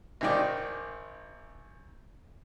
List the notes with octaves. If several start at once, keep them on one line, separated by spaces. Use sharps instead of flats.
G#1 D#3 D5